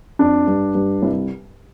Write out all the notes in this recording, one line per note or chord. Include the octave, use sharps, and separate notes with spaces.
F2 D4
G2
G2
C2